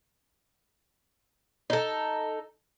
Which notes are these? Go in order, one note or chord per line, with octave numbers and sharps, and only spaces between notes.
D#4 A4